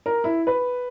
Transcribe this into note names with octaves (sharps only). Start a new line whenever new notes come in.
A#4
E4
B4